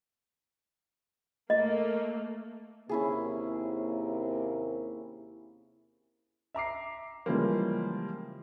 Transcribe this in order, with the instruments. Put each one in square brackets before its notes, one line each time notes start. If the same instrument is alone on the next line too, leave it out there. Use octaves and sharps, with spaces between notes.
[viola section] A3 A#3 [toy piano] D#5
[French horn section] D#2 C3 A#3 [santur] C#4 E4 G#4
[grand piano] E5 A#5 D6 C7
C#3 E3 F3 G3 G#3 A#3